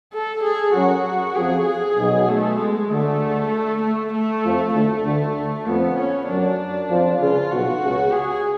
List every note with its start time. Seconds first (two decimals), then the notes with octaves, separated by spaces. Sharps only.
0.13 A4
0.44 G#4
0.74 F#2 F#3 F#4
1.35 F2 F3 G#4
1.66 G#4
1.97 B1 B2
2.28 A3
2.58 G#3
2.90 D2 D3 A3
3.82 A3
4.13 A3
4.43 F2 F3
4.74 D2 D3 A3
5.05 D2 D3
5.66 F2 F3 B3
5.97 C#4
6.28 F#2 F#3 D4
6.89 F2 F3
7.20 C#2 C#3 F4
7.51 B1 B2 F#4
7.82 C#2 C#3
8.12 G#4